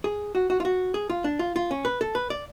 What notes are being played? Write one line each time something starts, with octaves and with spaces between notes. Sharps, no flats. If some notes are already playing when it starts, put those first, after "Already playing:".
G#4
F#4
F#4
F4
F#4
G#4
F4
D4
F4
F4
C#4
B4
A4
B4
D5